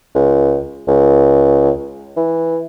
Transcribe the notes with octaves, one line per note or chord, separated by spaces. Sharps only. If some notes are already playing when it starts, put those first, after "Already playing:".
C#2
C#2
E3